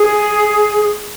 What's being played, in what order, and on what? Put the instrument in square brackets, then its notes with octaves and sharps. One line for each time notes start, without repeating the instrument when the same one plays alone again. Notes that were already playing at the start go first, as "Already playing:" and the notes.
Already playing: [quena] G#4